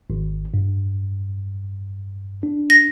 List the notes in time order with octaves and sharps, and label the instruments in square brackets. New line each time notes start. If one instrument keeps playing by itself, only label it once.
[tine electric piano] G#1
G2
D4
[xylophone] A#6